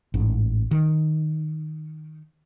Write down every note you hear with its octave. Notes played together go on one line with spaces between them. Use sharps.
A1 G#2
D#3